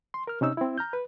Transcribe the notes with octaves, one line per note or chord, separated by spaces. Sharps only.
C6
A#4 F6
C3 C#4 D#4 E6
C4 E4
A#5 F6 G6
B4